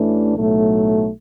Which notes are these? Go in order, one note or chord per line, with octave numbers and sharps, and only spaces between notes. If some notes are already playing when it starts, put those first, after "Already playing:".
Already playing: A1 A2 E3 A3 D4
B1 A2 F#3 A3